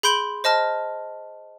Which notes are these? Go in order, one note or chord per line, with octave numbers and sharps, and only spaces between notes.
G#4 B5 C6 G6 D7 F#7
C5 D#5 A5 F6